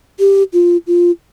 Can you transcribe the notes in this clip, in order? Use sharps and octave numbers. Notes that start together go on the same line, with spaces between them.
G4
F4
F4